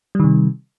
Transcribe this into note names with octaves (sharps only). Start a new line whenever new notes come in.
C3 D#3 G3